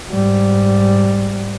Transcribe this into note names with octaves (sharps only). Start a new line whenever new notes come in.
G#2 G3